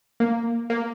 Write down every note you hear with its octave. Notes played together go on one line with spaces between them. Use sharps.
A#3
A#3